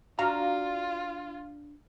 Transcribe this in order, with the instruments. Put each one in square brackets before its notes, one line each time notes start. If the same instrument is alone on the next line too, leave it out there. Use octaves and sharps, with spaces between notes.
[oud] D4 F#4 [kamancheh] F4 [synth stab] F5 A#5